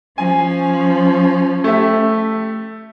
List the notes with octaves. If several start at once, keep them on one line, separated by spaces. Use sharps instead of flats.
F3 C#4 G#5
A3 G4 E5